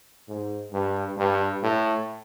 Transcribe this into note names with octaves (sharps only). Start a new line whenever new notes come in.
G#2
G2
G2
A2